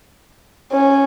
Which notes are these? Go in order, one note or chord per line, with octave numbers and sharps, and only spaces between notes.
C#4